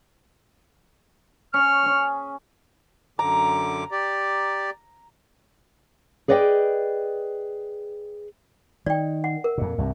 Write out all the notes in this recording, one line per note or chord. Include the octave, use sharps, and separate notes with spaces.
C#4 C#6 F6
C#4 G#4
F#2 D3 A#5 D6
G4 D5
G#4 B4 D5 D#5 F#5 G5
D#3 D5 G5
F#5
A#4
F2 A#2
C2 G2